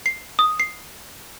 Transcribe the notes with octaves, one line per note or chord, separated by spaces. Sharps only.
C7
D#6
C7